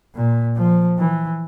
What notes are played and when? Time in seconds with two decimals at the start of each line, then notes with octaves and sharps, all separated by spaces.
0.15 A#2
0.57 F3
0.98 E3